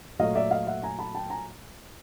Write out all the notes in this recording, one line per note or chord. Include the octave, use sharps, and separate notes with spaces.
A#2 F#3 A3 D#5 F5
D5 E5
D#5 F5
E5 F#5
G#5 A#5
A5 B5
G5 A5
G#5 A#5